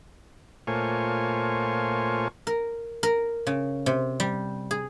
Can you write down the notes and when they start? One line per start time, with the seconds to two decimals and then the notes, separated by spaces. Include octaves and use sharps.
0.67 A#2 A3 F4 C5 C#5 G#5
2.47 A#4
3.03 A#4
3.47 C#3
3.86 C3
4.20 G3
4.71 G#4